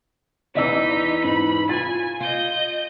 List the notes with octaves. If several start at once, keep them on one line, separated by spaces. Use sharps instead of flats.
E2 E3 D#4 D5 D#5 E6 B6
G#2 B5
F4 G#5 A6
F4 D#5 G6